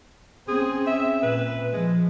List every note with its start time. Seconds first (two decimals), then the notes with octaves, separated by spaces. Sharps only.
0.48 C4 C#4 G#4
0.87 E5
1.23 A#2 B4
1.73 F3 G#3